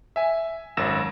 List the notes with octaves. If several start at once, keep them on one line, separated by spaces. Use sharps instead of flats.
E5 G#5
G#1 F#2 E6 A#6 E7